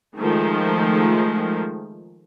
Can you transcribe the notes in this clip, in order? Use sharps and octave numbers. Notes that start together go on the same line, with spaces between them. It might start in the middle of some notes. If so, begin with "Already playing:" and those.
D#3 F3 G#3 A3